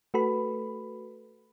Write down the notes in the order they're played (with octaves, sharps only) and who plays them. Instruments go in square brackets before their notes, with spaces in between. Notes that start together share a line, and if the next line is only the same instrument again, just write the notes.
[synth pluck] A3 F#4 A4 B4 B5